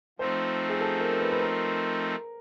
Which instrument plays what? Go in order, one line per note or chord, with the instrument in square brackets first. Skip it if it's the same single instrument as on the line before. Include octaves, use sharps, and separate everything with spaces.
[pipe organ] F3 A3 C4 D#4 [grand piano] C5
[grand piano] G#4
A4
A#4
B4
B4
A#4